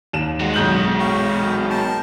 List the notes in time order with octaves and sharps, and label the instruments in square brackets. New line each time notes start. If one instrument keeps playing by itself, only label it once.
[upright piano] D#2 E7
[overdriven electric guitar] G#3 F#4
[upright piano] B1 G6 F#7 [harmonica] D#5
[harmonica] F5 G5 C#6
A#4 G5 A5